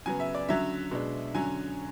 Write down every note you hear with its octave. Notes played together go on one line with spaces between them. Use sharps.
C#3 F#3 B3 G#5
E5
D5
D3 F#3 C#4 E5
B2 G#3 D4
D3 F#3 C#4 G#5